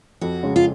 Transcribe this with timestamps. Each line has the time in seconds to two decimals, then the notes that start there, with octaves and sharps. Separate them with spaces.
0.21 F2 F#4
0.43 C#3 G#3 C#4 G#4
0.56 F4